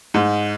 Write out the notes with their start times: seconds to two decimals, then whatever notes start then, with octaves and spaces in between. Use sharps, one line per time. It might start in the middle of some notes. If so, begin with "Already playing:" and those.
0.14 G#2